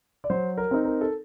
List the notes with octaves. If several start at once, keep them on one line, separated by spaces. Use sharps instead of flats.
D5
F#3 C5
A#4
C4 D#4
A#4
A4